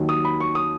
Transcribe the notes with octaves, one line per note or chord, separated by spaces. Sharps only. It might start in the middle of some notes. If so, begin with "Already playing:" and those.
Already playing: D#2 D#3 F#3
D#6
B5
C#6
D#6